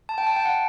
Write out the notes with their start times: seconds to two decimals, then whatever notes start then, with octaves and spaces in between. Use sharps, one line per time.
0.09 A5
0.18 G5
0.27 A5
0.36 G5
0.45 F#5